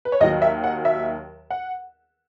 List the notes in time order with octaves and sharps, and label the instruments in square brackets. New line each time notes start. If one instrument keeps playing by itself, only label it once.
[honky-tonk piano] B4
C#5
D#2 D#3 F#3 D#5
E5
F#5
E5
F#5